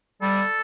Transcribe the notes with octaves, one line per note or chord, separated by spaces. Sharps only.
G3 A4